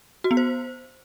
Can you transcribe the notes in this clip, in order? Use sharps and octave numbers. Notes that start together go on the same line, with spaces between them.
F#4
B3
C5